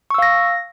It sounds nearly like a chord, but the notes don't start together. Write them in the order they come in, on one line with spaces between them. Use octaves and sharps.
C#6 E6 F5 A#6